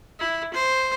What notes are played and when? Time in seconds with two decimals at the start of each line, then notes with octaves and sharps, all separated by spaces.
0.19 E4
0.54 C5